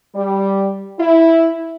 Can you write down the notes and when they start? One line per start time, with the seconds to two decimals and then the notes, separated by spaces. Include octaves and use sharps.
0.15 G3
0.99 E4